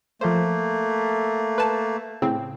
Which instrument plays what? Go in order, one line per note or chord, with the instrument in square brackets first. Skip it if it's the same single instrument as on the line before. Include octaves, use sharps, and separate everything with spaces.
[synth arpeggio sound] F3 C5 [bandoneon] A3 A#3
[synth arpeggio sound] B4 A5
A2 C#3 C4